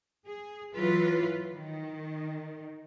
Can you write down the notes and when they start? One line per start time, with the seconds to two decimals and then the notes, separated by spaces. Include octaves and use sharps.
0.27 G#4
0.75 E3 F#3 F4 B4
1.53 D#3